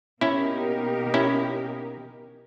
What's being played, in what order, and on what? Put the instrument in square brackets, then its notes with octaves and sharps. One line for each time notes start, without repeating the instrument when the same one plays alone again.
[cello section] B2 A#3 D#4 G4 A#4 [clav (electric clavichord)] C#4 E4
[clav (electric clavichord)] C#4 E4